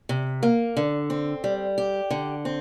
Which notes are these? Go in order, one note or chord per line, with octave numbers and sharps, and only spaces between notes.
C3
A#3
D3
C4
G3
G4
D3
C4